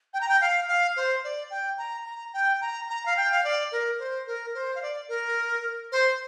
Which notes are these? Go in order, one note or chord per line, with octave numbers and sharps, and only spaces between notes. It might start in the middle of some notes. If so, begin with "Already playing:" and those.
G5
A#5
G5
F5
F5
C5
D5
G5
A#5
A#5
G5
A#5
A#5
F5
G5
F5
D5
A#4
C5
A#4
C5
F5
D5
A#4
C5